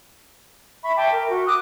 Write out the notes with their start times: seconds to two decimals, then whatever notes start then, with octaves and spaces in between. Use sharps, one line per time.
0.83 E5 B5 C#6
0.97 E5 G5 A5 D6
1.12 A#4
1.29 F#4
1.46 D6 D#6 F#6